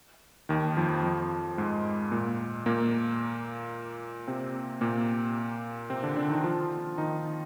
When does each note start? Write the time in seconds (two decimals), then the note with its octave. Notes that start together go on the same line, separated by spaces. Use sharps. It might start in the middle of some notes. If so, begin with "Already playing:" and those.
0.49 D#2 D#3
0.77 F2 F3
1.03 F2 F3
1.58 G#2 G#3
2.11 A#2 A#3
2.66 A#2 A#3
4.28 C3 C4
4.81 A#2 A#3
5.90 C3 C4
6.03 D3 D4
6.16 D3 D4
6.30 D#3 D#4
6.44 F3 F4
6.98 D#3 D#4